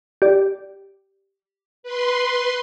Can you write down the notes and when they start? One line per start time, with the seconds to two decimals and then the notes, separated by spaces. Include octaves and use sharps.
0.22 G4 D5
1.83 B4 C6